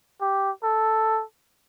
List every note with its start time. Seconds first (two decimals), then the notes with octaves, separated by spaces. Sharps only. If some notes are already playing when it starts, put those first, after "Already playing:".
0.21 G4
0.63 A4